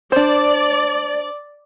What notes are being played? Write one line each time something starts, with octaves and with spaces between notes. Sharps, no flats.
D4 C5 D5